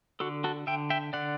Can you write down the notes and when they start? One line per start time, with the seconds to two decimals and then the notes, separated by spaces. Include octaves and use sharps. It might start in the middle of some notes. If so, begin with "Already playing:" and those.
0.20 D3 F#4 A4
0.44 F#4 A4
0.67 D3 E5 G5
0.90 E5 G5
1.13 D3 D5 F#5